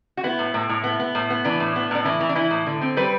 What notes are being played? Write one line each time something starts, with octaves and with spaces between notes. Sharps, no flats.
F#4
B3 E4
A2
A2
A2
B3
B3
A2
B3
E3 D4
A2
B3
A2 D4
E3 E4
E3
D4
E3 E4
A2
D3
C4
G3 B4